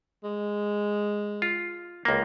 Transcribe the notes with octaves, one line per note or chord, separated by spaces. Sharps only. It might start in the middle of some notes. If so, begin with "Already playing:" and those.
G#3
F4
C#2 A#3